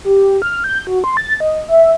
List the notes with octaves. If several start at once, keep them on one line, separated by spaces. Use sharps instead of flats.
G4
F6
G6
F#4
C6
A6
D#5
E5